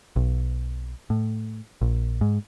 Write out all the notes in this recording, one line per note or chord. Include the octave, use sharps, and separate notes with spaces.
B1
A2
A#1
G#2